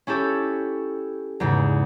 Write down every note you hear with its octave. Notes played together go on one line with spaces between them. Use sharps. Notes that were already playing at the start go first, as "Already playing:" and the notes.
C#4 E4 G4 A4 C#5
E2 G#2 C#3